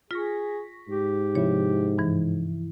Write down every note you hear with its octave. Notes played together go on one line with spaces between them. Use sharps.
F4 G#4 C#6 A#6 B6
G#2 G4
C3 F3 E4 C#5
G2 E3